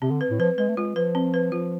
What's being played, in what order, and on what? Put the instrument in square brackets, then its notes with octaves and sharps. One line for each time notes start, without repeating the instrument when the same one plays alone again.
[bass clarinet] C3 [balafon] C4
[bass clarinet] D3
[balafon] B4
[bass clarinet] A2
[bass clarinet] F3 [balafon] B4
[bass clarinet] G#3 [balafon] B4
[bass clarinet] A3
[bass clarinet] G#3 [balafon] F4
[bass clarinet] F3 [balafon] B4
[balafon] C4
B4
[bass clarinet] F3 [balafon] F4